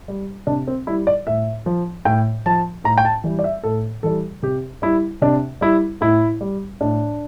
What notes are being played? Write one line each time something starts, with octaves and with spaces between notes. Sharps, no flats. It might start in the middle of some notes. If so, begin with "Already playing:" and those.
G3
C3 D4
C4
G3 E4
D5
A2 E5
F3
A2 G5
F3 A5
A2 A#5
G5
A5
E3 G3
D5
E5
A2 A4
E3 G3 A4
C3 G4
G3 E4
C3 D4
G3 E4
A2 E4
G3
A2 D4